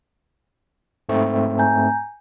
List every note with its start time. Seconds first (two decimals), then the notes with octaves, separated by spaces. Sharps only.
1.09 G#2 A3 C4
1.59 G#5 A#5 G6